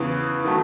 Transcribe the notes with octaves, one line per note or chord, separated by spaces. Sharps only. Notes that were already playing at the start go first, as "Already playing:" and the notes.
Already playing: E2 C#3 E3
D#3 F#3 A3